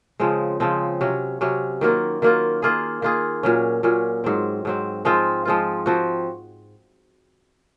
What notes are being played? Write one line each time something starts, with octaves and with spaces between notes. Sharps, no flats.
C#3 F3 G#3 C4
C#3 F3 G#3 C4
C3 F#3 C#4
C3 F#3 C#4
D#3 F#3 A#3 F4
D#3 F#3 A#3 F4
D#3 A#3 F4 G#4
D#3 A#3 F4 G#4
A#2 F#3 C#4
A#2 F#3 C#4
G#2 F#3 C4
G#2 F#3 C4
F3 G#3 C4 F4
F3 G#3 C4 F4
F3 C4 F#4